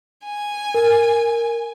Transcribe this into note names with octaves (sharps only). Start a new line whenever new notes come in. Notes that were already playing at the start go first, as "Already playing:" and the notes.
G#5
A#4